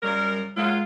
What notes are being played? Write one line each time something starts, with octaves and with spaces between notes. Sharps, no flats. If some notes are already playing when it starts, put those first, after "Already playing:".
F#2 C#3 G3 A#4
A#2 F#3 G#3 F4